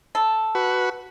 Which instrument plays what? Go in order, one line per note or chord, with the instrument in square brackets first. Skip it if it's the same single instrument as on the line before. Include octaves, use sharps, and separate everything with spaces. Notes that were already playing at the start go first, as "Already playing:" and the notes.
[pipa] A4
[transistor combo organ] F#4 B4